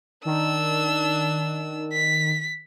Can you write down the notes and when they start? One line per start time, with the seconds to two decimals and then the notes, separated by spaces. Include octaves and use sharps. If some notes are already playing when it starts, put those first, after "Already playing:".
0.25 D#3 D4 E6
1.93 B6